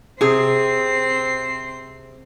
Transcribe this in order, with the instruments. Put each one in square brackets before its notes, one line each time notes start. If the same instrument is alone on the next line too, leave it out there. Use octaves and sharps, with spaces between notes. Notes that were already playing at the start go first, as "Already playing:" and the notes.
[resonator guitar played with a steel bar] C3 G#4 [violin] C4 C7